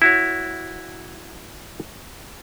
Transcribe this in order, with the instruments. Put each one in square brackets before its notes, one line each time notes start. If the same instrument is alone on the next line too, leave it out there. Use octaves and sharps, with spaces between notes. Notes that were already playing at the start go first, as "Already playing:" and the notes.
[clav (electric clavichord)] E4 F#4 C#5